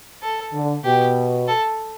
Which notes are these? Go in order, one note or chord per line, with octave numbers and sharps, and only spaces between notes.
A4
D3
B2 G4
A4